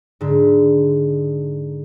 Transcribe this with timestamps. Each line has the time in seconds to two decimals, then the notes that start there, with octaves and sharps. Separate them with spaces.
0.21 G#2 D3